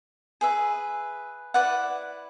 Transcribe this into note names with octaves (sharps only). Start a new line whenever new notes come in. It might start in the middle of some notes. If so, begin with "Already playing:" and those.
G#4 B4 E5
E4 B4 D5 F#5